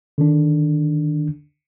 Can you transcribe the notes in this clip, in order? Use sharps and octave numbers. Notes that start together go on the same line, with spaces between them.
D3 D#3 D4